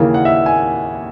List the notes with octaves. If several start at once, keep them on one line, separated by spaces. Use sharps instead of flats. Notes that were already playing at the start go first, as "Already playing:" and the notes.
Already playing: D#2 C#3 E3 A#3
F#5
E5
G#5